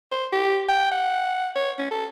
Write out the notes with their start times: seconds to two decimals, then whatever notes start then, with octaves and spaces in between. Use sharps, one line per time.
0.12 C5
0.33 G4
0.69 G5
0.92 F#5
1.56 C#5
1.79 C#4
1.91 A4